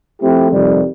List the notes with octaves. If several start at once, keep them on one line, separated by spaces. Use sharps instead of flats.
F3 A3 C4 E4 G4
F2 C3 D#3 G3